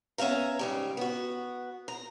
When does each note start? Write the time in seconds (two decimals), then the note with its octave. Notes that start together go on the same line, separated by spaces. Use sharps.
0.18 B3 C#4 E5 F5 A#5
0.59 G#2 C#3 G3
0.97 B3 F#4
1.88 A#5